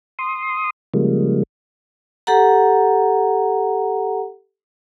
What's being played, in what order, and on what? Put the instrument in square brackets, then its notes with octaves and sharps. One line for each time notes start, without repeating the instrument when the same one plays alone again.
[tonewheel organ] C6 D#6
C#3 F3 G3 G#3 A#3
[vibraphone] G4 A4 F#5 A#5